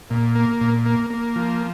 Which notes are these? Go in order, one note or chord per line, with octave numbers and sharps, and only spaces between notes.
A#2
A#3
A#2
A#3
A#3
F3